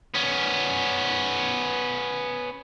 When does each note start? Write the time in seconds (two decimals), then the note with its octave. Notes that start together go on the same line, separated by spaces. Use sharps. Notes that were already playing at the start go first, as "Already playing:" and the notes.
0.15 B3 C#4